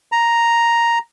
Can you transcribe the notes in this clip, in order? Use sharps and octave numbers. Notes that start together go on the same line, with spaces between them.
A#5